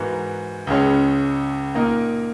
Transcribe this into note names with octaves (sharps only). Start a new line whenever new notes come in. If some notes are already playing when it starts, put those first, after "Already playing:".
Already playing: G#2 E3 B3 F#4 A#4
C#2 C#3 G#3 C#4
A#2 A#3 D#4 A#4